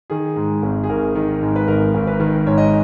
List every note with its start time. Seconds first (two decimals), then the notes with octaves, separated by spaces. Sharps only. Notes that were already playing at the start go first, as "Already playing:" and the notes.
0.10 D#3 G#4
0.36 G#2
0.63 G#1
0.84 G#4
0.89 G#1 A#4
1.15 D#3
1.42 G#2
1.56 B4
1.68 G#1 A#4
1.94 G#1
2.07 B4
2.20 D#3
2.46 G#2 C#5
2.58 D#5